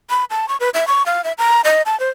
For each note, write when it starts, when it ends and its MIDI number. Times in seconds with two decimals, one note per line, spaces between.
0.10 0.25 83
0.30 0.48 81
0.49 0.57 85
0.60 0.69 71
0.74 0.87 76
0.88 1.05 85
1.06 1.24 77
1.24 1.33 76
1.38 1.61 82
1.64 1.82 75
1.86 1.98 81
2.00 2.09 72